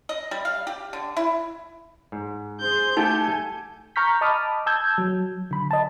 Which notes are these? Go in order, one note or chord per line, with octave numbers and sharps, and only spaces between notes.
D#5
G3
F5
G4
D3
E4
G#2
G#4 C5 C6 G6
A3 D#4 G4 A4 F#5 G#5 A5
A#5 C#6 F6 G6 B6
D#5 A5 B5 D6 D#6 F6
A5 E6 G6 G#6
F#3
D3 B5
D#5 A5